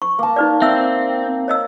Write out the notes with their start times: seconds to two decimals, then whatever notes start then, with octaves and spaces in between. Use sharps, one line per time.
0.02 C#6
0.19 A#3 A5
0.36 D#4 B4 D5
0.62 C4 E5 E6
1.48 C#5 D#5 E6